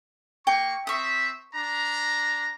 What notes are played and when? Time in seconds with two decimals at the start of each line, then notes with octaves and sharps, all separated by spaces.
0.47 A#3 G5 C#6
0.87 C4 E5 C#6 D#6
1.55 D4 A#5